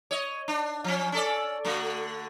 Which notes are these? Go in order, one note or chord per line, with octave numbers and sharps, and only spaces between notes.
C#5 D#5
D4
F3 C#4
C#4 A4 D5
D3 A3 F#4